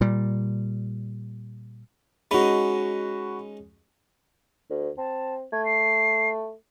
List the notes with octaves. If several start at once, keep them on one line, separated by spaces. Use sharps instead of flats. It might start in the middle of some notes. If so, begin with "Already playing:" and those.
A#2 G3
G#3 C#4 D#4 F#4 B5
D2
C4 A5
A3 G#6
C7